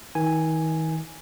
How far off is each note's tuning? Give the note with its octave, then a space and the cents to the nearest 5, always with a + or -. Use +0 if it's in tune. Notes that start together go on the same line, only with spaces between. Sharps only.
D#3 +40 G#5 +0